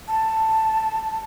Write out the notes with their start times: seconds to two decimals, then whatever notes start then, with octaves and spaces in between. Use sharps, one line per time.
0.08 A5